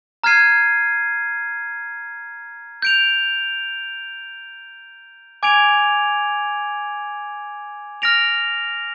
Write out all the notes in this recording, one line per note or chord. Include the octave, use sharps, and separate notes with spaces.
A#5 F6 G#6 C7 D#7
G6 D7 F7
G#5 D6 G#6 D7 F7
F6 A#6 D7 F7